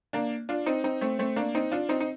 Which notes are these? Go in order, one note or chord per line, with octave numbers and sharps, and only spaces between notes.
A#3 D4
D4 F4
C4 D#4
C4 D#4
A3 C4
A3 C4
A#3 D4
C4 D#4
D4 F4
C4 D#4
D#4